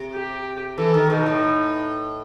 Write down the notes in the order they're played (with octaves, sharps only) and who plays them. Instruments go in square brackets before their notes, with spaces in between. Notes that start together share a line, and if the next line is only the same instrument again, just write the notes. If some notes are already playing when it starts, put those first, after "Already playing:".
Already playing: [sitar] C3
[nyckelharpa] G4
[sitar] E3 [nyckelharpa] A4
[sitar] D#3
[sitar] B2 [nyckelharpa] D#4
[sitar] A2